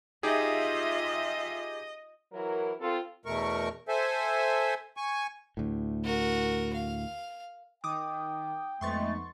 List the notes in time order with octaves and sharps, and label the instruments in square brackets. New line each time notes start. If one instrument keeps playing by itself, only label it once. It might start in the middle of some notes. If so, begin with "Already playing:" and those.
[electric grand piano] D#4 G4 G#4 [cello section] F4 E5 [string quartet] D#5
[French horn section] E3 F#3 E4 A#4
C4 F4 A4
[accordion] E2 B2 A3 A#4 C#6
A4 C5 E5 G#5
G#5 C#6
[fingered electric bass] D2 A2
[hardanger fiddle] F#4 A#4
F5
[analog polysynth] D#3 [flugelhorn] G5 [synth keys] D6 D#6
[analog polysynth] F2 B3 D#4 [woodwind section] G#3 A3 [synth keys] C6 C#6 A6